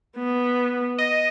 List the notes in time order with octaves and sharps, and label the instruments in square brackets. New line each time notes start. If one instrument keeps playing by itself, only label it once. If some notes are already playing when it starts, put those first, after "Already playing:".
[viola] B3
[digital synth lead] D#5